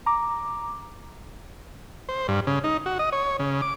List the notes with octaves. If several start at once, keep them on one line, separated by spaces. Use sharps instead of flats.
A#5 D6
C5
G2
C#3
D#4
F#4
D#5
C#5
C#3
D6